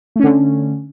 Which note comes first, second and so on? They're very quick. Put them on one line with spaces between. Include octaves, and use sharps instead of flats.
A3 C#4 D3